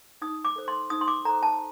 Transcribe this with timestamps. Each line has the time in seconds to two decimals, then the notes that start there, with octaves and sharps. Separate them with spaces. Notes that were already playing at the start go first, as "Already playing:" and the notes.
0.22 D#4 D#6
0.45 D6
0.56 A4 C5
0.68 C6
0.90 D#4 D#6
1.01 C6
1.08 D6
1.25 A4 C5 A#5
1.43 A5